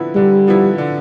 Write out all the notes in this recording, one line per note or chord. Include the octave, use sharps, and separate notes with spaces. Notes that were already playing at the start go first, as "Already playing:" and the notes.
Already playing: D3 F3 B3 E4
D3 G3
F3 B3 E4
D3